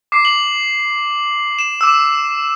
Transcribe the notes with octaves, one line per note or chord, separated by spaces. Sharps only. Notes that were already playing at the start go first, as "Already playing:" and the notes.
D6 C7
F#7
E7
D6 E6